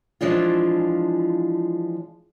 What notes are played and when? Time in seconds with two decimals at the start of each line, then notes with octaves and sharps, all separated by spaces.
0.21 E3 F3 G#3 D4 F4